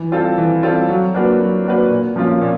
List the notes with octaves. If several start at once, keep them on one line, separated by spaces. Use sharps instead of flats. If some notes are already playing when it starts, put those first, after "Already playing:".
Already playing: E3
G3 C4 F4 A4
E3
G3 C4 F4 A4
F#3
A#3 D4 F#4 B4
F#3
A#3 D4 F#4 B4
A#2
F3 A#3 C#4 F4
A#2